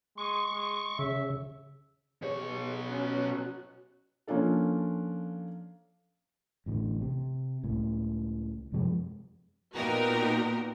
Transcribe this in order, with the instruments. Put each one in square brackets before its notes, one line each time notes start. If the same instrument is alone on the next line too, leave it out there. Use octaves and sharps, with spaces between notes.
[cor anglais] G#3 [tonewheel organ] C#6
[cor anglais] G#3
[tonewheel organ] C#3 [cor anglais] E5
[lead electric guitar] B2 C#5 [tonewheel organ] G4 G#4
[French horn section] C#4 [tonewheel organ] F#4 F#6
[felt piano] F3 A#3 C#4 D4 A4
[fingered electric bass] A1 A2 D3
C3
C#2 A2
F#2 C3 F3 G#3
[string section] A#2 B3 D#4 F#4 G4 A#4